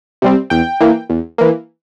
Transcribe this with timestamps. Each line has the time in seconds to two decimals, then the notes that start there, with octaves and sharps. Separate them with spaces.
0.22 C3 G3 C4
0.50 E2 G5
0.81 E3 A#3
1.10 E2
1.38 E3 A#3